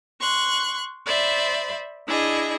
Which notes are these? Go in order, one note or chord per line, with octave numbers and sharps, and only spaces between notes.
C6 C#6 F#6
C5 D5 E5 B5
D4 E4 G#4 D#5